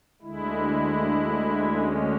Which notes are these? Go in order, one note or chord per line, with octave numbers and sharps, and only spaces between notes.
D2 D3 G#3 E4
C#4